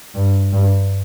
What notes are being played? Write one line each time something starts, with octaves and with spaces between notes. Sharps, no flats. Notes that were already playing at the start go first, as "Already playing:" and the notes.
G2
G2